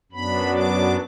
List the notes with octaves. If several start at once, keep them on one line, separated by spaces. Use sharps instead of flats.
F#2 F#3 B3 D4 B5
D6